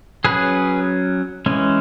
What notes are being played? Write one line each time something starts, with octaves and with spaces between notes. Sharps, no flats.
F#3 C#4 G#4 B4
E3 G#3 C#4